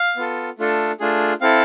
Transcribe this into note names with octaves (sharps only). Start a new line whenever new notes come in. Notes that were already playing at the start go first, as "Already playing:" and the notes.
Already playing: F5
B3 F4 A4
A3 D4 F4 A4
A3 D4 F4 G#4
C4 E4 A4 F5